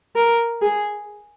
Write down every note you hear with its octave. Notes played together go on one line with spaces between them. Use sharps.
A#4
G#4